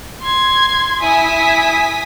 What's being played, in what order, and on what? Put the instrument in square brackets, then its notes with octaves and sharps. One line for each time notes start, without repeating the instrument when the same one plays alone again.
[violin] C6 G#6
[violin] E4 [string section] G#5 D#6 B6